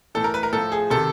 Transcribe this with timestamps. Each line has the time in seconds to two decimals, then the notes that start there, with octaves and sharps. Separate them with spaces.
0.15 A2 E3 A4
0.24 A#4
0.34 B4
0.43 A#4
0.53 A2 F3 A4
0.72 G#4
0.90 C3 D#3 A4